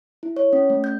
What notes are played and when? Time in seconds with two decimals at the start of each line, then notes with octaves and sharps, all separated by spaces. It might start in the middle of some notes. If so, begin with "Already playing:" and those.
0.23 E4
0.37 C#5
0.53 C#4
0.70 A3
0.84 G6